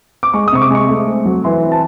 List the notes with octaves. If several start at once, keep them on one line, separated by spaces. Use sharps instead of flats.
D6
G#3 C#6
D#6
C3 C#6
D6
G#3 C#6
A3
C4
F#3
E3 C6
C4
A5